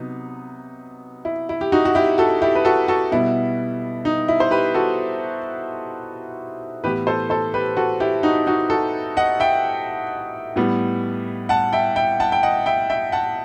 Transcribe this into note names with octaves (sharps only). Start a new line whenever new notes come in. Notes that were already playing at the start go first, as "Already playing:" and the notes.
Already playing: C3 F#3 B3 D#4
E4
E4
G4
D#4 F#4
F#4
E4 G4
F#4 A4
E4 G4
B4
F#4 A4
F#4 A4
B2 G3 B3 E4
D#4
E4
C5
G4 B4
F#4 A4
A2 E3 B3 G4 B4
A4 C5
A4 C5
G4 B4
F#4 A4
E4 G4
D#4 F#4
D#4 F#4
F#4 A4
D#5 F#5
E5 G5
A2 G3 B3
F#5 A5
E5 G5
E5 G5
F#5 A5
G5
D#5 F#5
E5 G5
E5 G5
F#5 A5